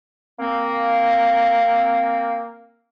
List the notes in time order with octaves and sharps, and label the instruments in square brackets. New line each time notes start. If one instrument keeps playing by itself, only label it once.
[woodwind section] A#3 C4